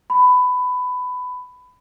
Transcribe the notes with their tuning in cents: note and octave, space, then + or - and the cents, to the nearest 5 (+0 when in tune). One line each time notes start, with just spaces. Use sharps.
B5 +15